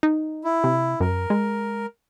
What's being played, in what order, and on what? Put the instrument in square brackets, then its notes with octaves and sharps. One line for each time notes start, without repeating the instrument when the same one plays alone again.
[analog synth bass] D#4
[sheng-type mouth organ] E4
[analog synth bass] C3
[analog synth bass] F#2 [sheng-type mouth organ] A#4
[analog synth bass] G#3